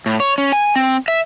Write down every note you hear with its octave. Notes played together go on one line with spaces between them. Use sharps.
A2
C#5
C#4
G#5
C4
E5